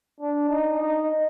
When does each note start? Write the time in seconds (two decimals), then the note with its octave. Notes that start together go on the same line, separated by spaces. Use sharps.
0.21 D4
0.50 D#4
0.80 D#4